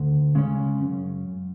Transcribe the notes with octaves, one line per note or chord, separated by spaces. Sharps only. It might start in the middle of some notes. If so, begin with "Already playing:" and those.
Already playing: D2
C#3 G#3 C#4
F#2